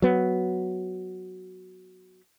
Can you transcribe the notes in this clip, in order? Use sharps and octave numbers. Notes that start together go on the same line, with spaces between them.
F#3 B3